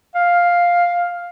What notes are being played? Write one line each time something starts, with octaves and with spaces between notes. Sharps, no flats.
F5